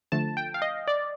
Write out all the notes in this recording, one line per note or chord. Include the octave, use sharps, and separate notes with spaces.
D3 F3 A3 A5
G5
F5
D#5
D5